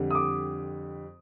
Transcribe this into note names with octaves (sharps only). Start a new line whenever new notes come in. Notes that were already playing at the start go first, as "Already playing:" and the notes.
Already playing: F2 D3 G3
D#6
D6